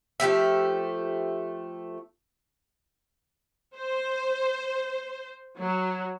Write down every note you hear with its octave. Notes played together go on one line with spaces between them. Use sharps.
F3 A3 G4 E5
C5
F#3